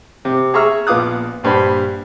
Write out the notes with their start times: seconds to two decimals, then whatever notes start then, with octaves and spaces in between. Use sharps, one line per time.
0.25 C3
0.54 G#4 E5 A#5 C#6 E6 F6
0.87 A#1 B3 F4 D6 D#6 F#6
1.43 A#1 G2 C5 B5